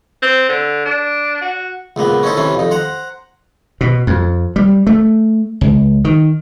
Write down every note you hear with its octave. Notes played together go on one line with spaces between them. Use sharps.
C4
D3
D4
F#4
C#2 A#2 A#3 B3
C#4 D#4 E4 A4 C5
C3 E3 C#4
F2 D#4
C5 F#5 A#5
B2
F2
G3
A3
C#2
D#3